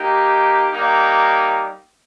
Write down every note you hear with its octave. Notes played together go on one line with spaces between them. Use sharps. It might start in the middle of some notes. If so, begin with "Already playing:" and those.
Already playing: A#3 D#4 G4
G3 A#3 D#4